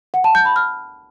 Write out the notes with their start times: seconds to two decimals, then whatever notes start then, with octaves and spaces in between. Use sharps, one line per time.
0.14 F#5
0.24 A5
0.35 G6
0.45 B5
0.56 F6